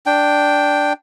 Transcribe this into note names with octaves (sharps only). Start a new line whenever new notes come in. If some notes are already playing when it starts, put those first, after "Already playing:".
D4 G5